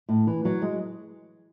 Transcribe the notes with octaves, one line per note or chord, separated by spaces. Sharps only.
A2
E3
F#3
G#3